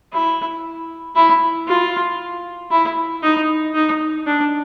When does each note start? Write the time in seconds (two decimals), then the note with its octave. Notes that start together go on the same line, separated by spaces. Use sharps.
0.12 E4
1.15 E4
1.67 F4
2.71 E4
3.23 D#4
3.74 D#4
4.27 D4